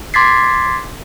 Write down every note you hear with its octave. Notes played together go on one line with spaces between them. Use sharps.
C6 D6 G#6 A6 B6 C7